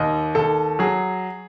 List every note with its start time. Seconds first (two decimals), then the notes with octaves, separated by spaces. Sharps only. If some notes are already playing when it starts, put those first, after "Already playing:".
Already playing: D#2 D#5
0.35 D#2 A4
0.79 F#3 G#4